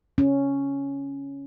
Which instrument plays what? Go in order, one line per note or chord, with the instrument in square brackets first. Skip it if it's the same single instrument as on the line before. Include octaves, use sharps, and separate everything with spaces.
[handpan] C#4